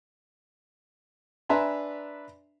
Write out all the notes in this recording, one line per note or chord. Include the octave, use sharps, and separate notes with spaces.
D4 B4 E5 G#5 A#5 C6